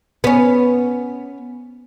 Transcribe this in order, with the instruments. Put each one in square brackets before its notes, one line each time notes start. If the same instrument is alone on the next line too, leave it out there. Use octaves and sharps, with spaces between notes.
[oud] B3 C#4